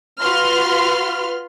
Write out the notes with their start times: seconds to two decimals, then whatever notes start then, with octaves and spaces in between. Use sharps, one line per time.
0.20 F4 F#4 B4 C6 F6